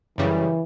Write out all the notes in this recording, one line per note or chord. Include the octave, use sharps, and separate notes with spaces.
F#2 C#3 E3 G3